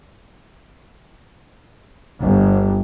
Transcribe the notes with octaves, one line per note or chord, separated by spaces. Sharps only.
G1